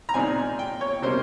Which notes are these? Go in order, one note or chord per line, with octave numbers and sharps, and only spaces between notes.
A#5
A#2 G#3 C4 D#4 G#5
G5
C#5
C3 G3 A#3 C#4 C5